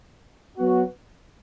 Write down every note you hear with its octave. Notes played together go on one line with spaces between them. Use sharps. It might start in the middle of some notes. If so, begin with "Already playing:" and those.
F#3 B3 F#4